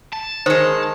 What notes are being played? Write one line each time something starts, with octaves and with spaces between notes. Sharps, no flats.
A5
D#3 G#3 C5